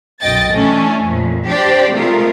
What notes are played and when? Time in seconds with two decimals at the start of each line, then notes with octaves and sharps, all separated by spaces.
0.21 B1 F#2 D#5 G5 A6
0.54 E3 A3 C#4 D4
1.01 F2 A#2
1.48 D4 G4 C5 D5 G5
1.92 C3 G#3 A3 F4 A#4